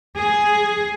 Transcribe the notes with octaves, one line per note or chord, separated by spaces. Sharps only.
G#4